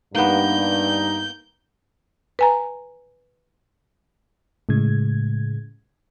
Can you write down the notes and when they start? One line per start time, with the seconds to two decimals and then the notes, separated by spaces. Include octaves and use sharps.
0.15 G2 A#3 B3 D#4 G6
2.39 B4 G#5 A#5
4.69 A2 C#3 G#3 G#6